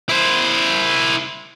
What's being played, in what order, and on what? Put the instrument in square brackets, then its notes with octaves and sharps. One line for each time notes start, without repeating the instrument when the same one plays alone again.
[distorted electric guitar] E4 C5